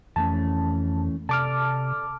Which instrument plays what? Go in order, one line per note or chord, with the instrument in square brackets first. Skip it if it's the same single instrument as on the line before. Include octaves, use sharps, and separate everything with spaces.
[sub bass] F2 [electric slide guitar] E3 A3 C#4 [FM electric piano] A5
[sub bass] C3 [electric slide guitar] A4 D5 [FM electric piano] A5 D6 F6